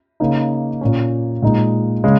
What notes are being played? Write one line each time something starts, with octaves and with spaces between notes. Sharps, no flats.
C#3 A#3 D#4
A#2 A#3 C#4
A#2 G#3 D#4
C#3 G#3